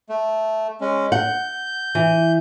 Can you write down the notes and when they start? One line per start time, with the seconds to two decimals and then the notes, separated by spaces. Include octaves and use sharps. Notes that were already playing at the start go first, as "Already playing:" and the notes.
0.09 A3
0.81 G#3 C#4
1.12 F#5 G6
1.95 E3